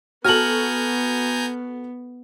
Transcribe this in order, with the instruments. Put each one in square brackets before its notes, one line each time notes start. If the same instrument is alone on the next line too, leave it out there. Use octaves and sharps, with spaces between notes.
[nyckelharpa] B3 [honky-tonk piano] F#4 A4 [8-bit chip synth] G#5 A#5 G6 [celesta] F6 F#7